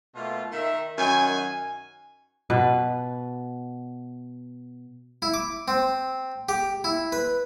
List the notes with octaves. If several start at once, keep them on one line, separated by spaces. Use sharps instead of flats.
B2 A3 A#3 F4
D#3 E5
F#2 D#3 G#5
B2 B4
E4
D6
C4
G4
E4
B4